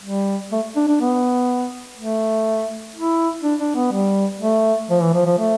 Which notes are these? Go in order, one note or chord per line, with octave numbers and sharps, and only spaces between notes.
G3
A3
D4
D4
B3
A3
E4
D4
D4
B3
G3
A3
F3
E3
F3
F3
A3